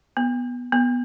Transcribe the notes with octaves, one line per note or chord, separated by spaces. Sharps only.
B3
B3